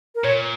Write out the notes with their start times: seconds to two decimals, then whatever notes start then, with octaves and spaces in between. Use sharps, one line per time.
0.15 A#4
0.24 A#2 C#5